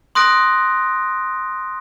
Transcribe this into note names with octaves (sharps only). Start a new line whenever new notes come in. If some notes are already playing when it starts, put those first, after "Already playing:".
C6 D#6 F#6 A#6 D7